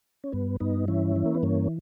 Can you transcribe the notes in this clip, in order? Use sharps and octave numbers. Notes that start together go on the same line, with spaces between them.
C#4
G2 B3
G2 B3 D#4
E3 C#4 E4
E3
A#3
B3
G2 A#3 C#4